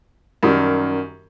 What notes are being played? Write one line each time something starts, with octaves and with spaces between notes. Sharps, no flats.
F#2 D#3 G3